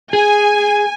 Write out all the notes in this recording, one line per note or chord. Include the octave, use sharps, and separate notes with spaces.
G#4 G#5